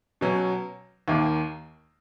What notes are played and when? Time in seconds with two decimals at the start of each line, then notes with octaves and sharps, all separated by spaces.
0.21 B2 F#3 C#4
1.08 D#2 D#3 A#3